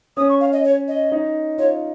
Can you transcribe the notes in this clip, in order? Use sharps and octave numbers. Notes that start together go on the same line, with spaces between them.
C#4 D#6
C#6
F5
D#5
C#5
D#5
D#4
F4 C#5